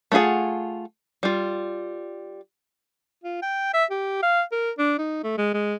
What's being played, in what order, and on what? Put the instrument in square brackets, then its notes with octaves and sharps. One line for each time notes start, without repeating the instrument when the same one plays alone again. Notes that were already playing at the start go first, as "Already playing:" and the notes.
[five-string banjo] A3 E4 F4 G#4 F#5
G3 F4
[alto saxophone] F4
G5
E5
G4
F5
A#4
D4
D#4
A3
G#3
G#3